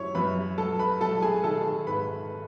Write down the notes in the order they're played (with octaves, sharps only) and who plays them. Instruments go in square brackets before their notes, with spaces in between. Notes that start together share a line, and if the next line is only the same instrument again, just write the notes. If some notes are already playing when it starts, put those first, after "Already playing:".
Already playing: [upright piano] F#2 E4 C#5 C#6
F#2 B4 B5
F#3 A4 A5
B4 B5
F#3 A4 A5
G#4 G#5
D#3 A4 A5
G#2 B4 B5